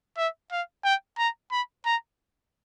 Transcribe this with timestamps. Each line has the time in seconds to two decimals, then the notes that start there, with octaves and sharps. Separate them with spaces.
0.17 E5
0.51 F5
0.84 G5
1.18 A#5
1.51 B5
1.86 A#5